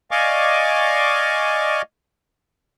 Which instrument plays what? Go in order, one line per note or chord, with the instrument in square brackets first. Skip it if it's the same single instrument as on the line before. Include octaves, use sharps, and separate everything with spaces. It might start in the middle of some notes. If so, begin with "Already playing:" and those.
[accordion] D5 D#5 F5 G#5 C#6 D6